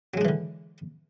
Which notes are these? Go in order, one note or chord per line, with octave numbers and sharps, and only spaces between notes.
D3 E3 F#3 G#3 D4